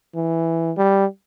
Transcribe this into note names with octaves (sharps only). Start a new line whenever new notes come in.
E3
G3